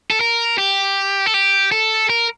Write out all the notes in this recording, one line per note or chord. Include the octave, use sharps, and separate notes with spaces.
A4
A#4
G4
A4
G4
A4
A#4